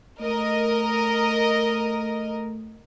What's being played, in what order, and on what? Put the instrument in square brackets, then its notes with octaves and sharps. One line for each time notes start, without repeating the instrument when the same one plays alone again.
[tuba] A3 [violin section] A#4 D#5